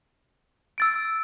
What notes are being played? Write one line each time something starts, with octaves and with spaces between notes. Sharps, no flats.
E6 A6 D7